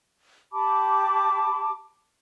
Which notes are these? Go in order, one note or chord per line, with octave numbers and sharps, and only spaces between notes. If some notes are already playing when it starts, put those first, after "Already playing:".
G4 A5 B5 D6